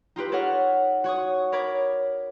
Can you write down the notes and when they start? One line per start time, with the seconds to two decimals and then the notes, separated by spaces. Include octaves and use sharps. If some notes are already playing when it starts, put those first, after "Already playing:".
0.16 D#4 F4 G4 B4
0.32 A4 B4 C#5 D#5 F#5 F6
1.04 F#4 C#5 C#6 D#6
1.52 A#4 C#5 B5 D6 G#6